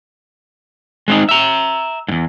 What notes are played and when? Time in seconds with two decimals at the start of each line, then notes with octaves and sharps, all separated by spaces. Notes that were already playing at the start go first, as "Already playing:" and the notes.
1.08 G#3 C4 D#4
1.29 E5 A#5
2.08 E2 G#2